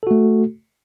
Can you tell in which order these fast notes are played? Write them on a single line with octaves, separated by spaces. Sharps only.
A4 F#4 A3